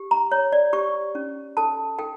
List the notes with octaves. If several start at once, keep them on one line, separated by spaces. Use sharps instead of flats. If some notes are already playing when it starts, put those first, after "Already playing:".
Already playing: G4
A#5
C#5
D5
G4 C#6
C#4
A4 A5
A4 G5